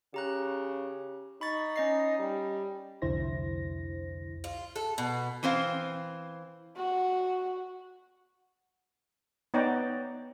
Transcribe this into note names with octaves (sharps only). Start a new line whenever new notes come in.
C#3 G4 A#5 F#6
D#4 B5 C#6 A6
C#4 D#5 C7
G3
C2 F2 D3 E4 C5 A#6
F4
A4
B2
E3 C4 C5 F5
F#4
B3 D#4 C#5 D5 G5 A#5